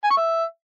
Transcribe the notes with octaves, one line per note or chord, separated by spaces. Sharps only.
G#5
C#6
E5